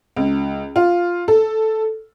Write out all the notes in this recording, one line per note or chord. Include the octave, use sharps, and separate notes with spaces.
C#2
F4
A4